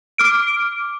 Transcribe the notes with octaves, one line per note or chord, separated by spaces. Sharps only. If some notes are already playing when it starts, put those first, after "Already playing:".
D6 F6 D7